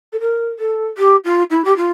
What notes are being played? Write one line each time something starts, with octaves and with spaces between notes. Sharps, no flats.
A4
A#4
A4
G4
F4
E4
G4
F4